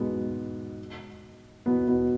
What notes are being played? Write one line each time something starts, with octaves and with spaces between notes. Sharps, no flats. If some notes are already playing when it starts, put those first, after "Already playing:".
Already playing: G#2 B2 G#3 B3
B2 B3
B2 B3